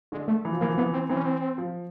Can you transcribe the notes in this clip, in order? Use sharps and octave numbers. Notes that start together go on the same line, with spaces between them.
D3 G#3
A3
E3
F3
E3 A#3
F3
E3 B3
C4
E3 C4
C#4
C4
F3